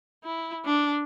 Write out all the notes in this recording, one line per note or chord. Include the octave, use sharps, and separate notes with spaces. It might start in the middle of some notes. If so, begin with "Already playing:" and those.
E4
D4